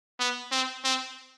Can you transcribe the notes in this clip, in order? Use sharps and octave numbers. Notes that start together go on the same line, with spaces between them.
B3
C4
C4